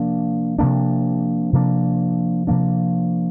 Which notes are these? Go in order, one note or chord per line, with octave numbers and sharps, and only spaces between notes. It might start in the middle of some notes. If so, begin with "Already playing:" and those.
Already playing: C3 F3 A#3 D4
C3 F3 A#3 D4
C3 F3 A#3 D4
C3 F3 A#3 D4